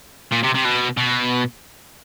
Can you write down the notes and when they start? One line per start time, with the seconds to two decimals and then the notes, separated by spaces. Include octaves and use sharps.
0.32 A#2
0.43 C3
0.54 C3
0.64 B2
0.97 B2